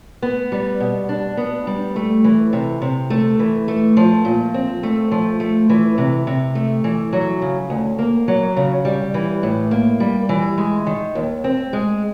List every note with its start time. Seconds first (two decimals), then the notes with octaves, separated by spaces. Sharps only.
0.22 B3
0.52 G3
0.80 B2
1.09 D4
1.37 B3
1.67 G3
1.96 A3
2.24 E3
2.53 C3
2.82 C3
3.10 A3
3.39 E3
3.68 A3
3.97 F3
4.25 A#2
4.54 C4
4.83 A3
5.12 F3
5.40 A3
5.69 E3
5.98 C3
6.27 C3
6.55 A3
6.84 E3
7.13 F#3
7.42 C#3
7.70 D2
7.99 A#3
8.28 F#3
8.56 C#3
8.85 G3
9.14 E3
9.43 A2
9.71 A#3
10.00 G3
10.29 E3
10.58 G#3
10.87 D#3
11.15 D#2
11.44 C4
11.73 G#3